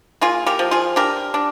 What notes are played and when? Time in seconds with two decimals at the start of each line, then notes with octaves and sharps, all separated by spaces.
0.21 A#3 F4 G#4
0.46 G4 A#4
0.59 F3
0.71 F4 G#4
0.96 D4 G4 A#4
1.34 D4